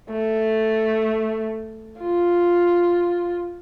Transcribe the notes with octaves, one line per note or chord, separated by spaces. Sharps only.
A3
F4